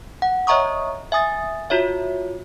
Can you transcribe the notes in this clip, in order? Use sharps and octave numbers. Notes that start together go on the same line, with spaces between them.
F#5
C#5 D#5 E5 A#5 C#6 D#6
E5 G#5 D#6 A6
F4 F#4 C#5 E5